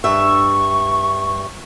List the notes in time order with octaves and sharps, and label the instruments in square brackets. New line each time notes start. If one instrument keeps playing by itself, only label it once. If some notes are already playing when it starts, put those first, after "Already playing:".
[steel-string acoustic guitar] G2 E5 [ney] C#6